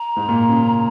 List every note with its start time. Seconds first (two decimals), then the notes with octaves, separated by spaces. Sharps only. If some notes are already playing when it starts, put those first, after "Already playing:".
Already playing: A#5
0.16 G#2
0.28 A#2
0.49 C#3